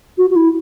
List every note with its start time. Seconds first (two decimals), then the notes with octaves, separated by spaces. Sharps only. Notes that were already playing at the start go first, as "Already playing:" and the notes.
0.18 F#4
0.30 F#4
0.36 E4